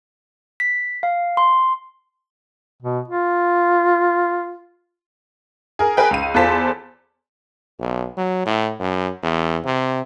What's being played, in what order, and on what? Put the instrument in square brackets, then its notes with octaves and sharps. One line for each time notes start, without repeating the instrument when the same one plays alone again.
[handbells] B6
F5
C6
[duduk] B2
F4
[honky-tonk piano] G#4 A#4
G#4 A#4 B4 G5
C#2 D#7
E2 F4 A4 C5 A5 B6
[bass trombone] B1
F#3
A2
F#2
E2
C3